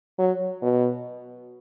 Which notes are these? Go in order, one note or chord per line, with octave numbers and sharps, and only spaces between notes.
F#3
B2